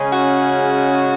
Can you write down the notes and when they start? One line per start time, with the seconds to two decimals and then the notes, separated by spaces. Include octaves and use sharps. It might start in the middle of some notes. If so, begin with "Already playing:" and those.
Already playing: C#3 G#3 C#4
0.13 F#4